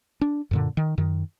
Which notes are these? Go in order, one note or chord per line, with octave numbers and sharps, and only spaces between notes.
D4
F#2 A#2 D3
D#3
F#2 D#3